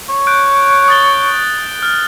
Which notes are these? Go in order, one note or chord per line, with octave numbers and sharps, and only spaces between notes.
C#5
F#6 G6 D7
D#6 A6 G7
F6